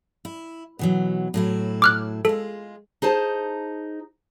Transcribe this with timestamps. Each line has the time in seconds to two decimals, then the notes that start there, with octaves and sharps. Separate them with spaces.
0.25 E4
0.79 B2 E3 F#3
1.34 A2 F#3 E4
1.82 D6 F6 F#6
2.25 G#3 F4 A4
3.02 D#4 G#4 C5 A5